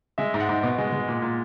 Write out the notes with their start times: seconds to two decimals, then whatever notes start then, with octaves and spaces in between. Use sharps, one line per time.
0.18 G#3 E5
0.34 G#2
0.40 F#5
0.49 G#2
0.63 B2
0.78 G#3
0.92 G#3
1.08 A#2
1.22 A#2